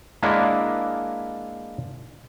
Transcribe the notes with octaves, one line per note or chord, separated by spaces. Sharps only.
G#3 A#3 D4 E4 A#4 F#5